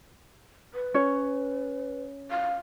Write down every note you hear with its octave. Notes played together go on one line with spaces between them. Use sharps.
B4
C#4 C#5
F5